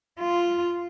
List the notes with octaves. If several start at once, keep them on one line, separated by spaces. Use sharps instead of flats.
F4